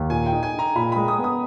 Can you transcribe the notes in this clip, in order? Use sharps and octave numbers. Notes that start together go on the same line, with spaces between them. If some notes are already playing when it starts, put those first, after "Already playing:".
Already playing: D#2
A#2 G#5
G5
D#4
G#5
D#4 A#5
A#2 B5
G#3 B5
D#6
B3
D#6